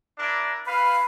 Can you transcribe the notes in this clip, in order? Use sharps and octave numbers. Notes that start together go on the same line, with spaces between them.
D4 E4 A#4
B4 F5 B5